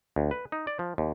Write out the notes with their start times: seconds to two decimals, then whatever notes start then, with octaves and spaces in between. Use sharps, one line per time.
0.16 D2
0.31 B4
0.52 D#4
0.67 D5
0.79 F3
0.98 D#2